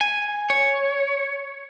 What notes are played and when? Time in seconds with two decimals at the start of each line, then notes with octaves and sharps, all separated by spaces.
0.01 G#5
0.50 C#5